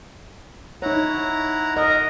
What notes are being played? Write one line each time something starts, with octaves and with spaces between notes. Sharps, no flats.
D#4 E4 C#5 F#5 A#5
A#4 D#5 A#5